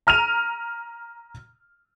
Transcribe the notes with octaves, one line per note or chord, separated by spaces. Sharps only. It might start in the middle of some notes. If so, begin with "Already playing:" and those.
A#5 F6 D#7 F7